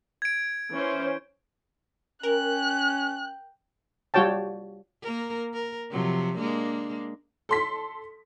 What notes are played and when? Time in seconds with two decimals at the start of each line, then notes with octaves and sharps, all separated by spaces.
0.22 G#6 D7
0.72 E3 C#4 C5
2.23 C#4 A#4 G5 F#6
4.14 G3 F4 F#4 C#5 G5 A5
5.02 A#3 A#4
5.53 A#4
5.91 C3 F3 F#3
6.36 G#3 A#3 D4
7.49 A4 C6 B6